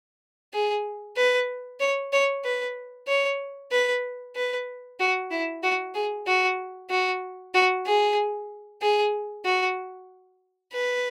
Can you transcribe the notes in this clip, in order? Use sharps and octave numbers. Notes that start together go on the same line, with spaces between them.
G#4
B4
C#5
C#5
B4
C#5
B4
B4
F#4
E4
F#4
G#4
F#4
F#4
F#4
G#4
G#4
F#4
B4